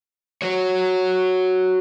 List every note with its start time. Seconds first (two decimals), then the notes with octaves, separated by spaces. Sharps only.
0.42 F#4 C#5